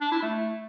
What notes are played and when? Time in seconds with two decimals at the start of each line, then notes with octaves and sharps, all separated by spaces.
0.01 D4
0.12 E4
0.22 A3